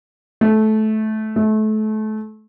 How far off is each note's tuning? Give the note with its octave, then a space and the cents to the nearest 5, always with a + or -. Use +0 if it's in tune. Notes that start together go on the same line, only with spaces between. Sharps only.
A3 -20
A3 -30